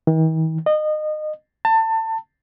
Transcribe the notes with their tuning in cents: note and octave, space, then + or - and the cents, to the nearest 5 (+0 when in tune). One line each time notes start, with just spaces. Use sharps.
D#3 +45
D#5 -25
A5 +25